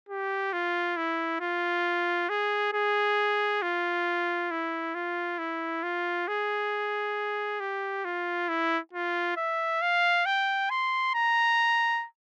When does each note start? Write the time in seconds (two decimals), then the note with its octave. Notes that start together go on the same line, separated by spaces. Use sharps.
0.09 G4
0.53 F4
0.97 E4
1.41 F4
2.29 G#4
2.73 G#4
3.62 F4
4.51 E4
4.95 F4
5.39 E4
5.83 F4
6.28 G#4
7.60 G4
8.05 F4
8.49 E4
8.93 F4
9.37 E5
9.82 F5
10.26 G5
10.70 C6
11.15 A#5